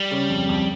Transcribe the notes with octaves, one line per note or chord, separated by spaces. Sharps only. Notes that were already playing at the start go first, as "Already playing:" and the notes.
Already playing: G3
C#3
F2
F2